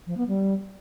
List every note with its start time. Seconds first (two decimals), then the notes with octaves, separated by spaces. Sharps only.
0.07 F3
0.17 B3
0.28 G3